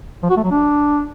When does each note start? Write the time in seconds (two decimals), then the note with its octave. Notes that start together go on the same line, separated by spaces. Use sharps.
0.23 F3
0.30 F#4
0.37 A3
0.44 F#3
0.51 D4